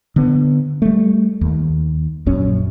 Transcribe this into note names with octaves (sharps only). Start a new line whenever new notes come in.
D3 B3
G3 A3
D#2
A#1 F#2 C#4